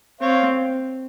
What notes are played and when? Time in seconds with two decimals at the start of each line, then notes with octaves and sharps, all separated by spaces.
0.21 C4 C#5 F5